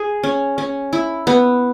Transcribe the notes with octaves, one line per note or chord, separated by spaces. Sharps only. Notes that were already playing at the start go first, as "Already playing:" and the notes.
Already playing: G#4
C#4
C#4
E4
B3